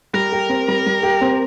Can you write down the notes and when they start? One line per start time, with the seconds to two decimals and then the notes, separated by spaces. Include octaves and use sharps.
0.14 G3 A#4
0.32 G4
0.49 C4
0.68 G3
0.86 G3
1.03 G4
1.21 C4